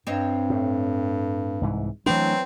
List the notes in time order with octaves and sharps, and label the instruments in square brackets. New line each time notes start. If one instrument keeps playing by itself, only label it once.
[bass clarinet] G2 [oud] C4 C#5 D#5
[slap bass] A2
C2 G#2 E3
[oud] E2 B4 [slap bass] E3 A3 D4 [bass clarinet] F#3 [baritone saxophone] C4